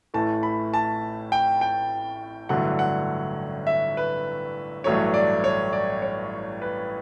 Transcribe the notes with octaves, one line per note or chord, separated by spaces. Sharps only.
A1 A2 E3 A3 A5
B5
A5
G5
G5
A1 G2 D3 F#3 A3 F#5
F#5
E5
B4
A1 G2 F#3 A3 C#5
D5
C#5
D5
C#5
B4